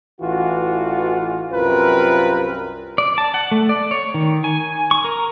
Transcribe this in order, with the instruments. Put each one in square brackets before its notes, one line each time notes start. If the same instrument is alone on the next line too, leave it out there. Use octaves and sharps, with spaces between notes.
[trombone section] A1 E3 F4 F#4
C2 F#2 C4 F4 A#4 B4
[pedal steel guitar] D5
A5
F#5
A3
D5
C#5
D#3
G#5
C#6
A#4